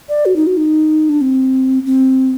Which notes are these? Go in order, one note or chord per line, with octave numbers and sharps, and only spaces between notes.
D5
F#4
D#4
F#4
D#4
D4
C4
C4